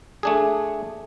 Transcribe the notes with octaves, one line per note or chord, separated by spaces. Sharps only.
A3 D4 G#4